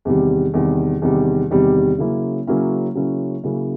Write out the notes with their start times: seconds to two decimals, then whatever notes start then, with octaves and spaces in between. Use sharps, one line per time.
0.05 E2 C3 D#3 G3
0.54 E2 C3 D#3 G3
1.02 E2 C3 D#3 G3
1.51 E2 C3 D#3 G3
1.98 C#3 F#3 A#3 C#4 E4
2.47 C#3 F#3 A#3 C#4 E4
2.95 C#3 F#3 A#3 C#4 E4
3.44 C#3 F#3 A#3 C#4 E4